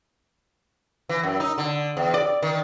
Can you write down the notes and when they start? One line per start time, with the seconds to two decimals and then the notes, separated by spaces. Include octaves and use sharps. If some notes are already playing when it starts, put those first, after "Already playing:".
1.09 E3
1.23 F#2
1.40 D#4
1.58 D3
1.97 E2
2.14 D5
2.42 D#3